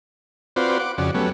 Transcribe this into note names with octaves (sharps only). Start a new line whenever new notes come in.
C4 F4 F#4 B4 C5 D5
F#5 D6
F2 C#3 F#4 D5
F#3 G3 A3 B3 C#4